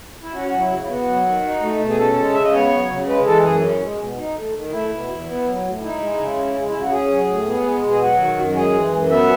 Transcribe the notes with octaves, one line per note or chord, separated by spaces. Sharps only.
E4
C#4 F#4
F#3 F#4
E4
C#3
E4
B3 F#4
F#3
D#3
D#4
A3
B2
G#4
C#4 A4
G#3
C#3 E5
D#5
B3 C#5
F#3
C#3
G#3 B4
E3 A4
F#2 G#4
C#4
G#3
B2
D#4
A3
D#3
A3 E4
B2
E2
B3
F#3
A2
D#4 E4
G#3
C#3
C#4
G#3
C#3 E4
F#4
C#4 G#4
F#3
A2
B3
G#3
B2
G#4
F#3 F#4
D#3
F#2
F#4
G#3 G#4
E3
F#2
B3 E5